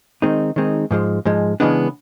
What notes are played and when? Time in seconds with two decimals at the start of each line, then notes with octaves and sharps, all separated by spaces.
0.22 D#3 G#3 C4 D#4
0.56 D#3 G#3 C4 D#4
0.91 G#2 F3 G#3
1.25 G#2 F3 G#3
1.60 C#3 E3 G#3 B3 D4